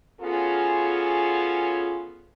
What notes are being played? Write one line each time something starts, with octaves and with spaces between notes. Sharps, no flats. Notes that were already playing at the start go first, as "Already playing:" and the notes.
B3 C#4 F4 F#4 G#4 A4